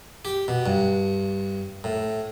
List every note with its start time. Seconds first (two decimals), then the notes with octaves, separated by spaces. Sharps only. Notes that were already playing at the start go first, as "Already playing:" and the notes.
0.25 G4
0.48 B2
0.66 G2
1.84 A2